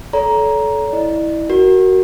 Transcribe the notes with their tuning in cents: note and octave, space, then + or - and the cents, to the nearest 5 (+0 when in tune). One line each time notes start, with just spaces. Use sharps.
A4 -25 C#5 +40 A#5 +10
E4 -15 D5 +35
F#4 +20 A#4 +0